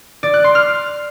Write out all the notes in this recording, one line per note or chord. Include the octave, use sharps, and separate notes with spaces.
D5
F#6
C6
F6